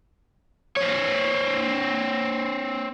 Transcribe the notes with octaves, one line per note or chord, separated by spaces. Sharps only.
C4 C#5